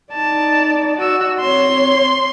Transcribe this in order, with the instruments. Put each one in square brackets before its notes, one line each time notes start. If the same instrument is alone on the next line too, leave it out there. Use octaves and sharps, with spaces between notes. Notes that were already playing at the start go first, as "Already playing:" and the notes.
[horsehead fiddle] D#4 D5 [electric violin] A5
[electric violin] F#4 E6
[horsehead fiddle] C4 C#5 [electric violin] C6